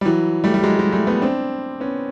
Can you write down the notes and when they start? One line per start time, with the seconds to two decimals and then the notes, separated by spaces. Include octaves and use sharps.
0.01 G3
0.05 E3 F#3
0.44 G3 A3
0.54 G3
0.63 F#3 G#3
0.79 F#3 G#3
0.92 G3 A3
1.07 A3 B3
1.22 C4 D4
1.80 B3 C#4